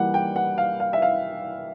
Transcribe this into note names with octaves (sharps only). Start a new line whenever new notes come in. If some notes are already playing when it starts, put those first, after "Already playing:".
Already playing: E3 G3 A#3 F#5
G5
F#5
F5
F5
E5
F5